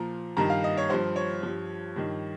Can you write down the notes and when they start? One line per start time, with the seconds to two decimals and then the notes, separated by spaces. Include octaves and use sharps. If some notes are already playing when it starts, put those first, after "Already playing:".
Already playing: A#2 F3 A#5
0.37 G2 D#3 A#5
0.50 F5
0.64 D#5
0.77 C#5
0.90 G2 F3 C5
1.16 C#5
1.43 G2 F3
1.96 G2 D#3